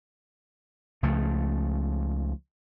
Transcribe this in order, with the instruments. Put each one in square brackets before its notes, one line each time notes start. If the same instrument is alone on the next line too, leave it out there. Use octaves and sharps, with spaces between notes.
[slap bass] C#2 C#3 F3 A3